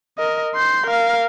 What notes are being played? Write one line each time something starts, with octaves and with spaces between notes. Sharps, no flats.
A#4 D#5
C6 G6
A#4 F5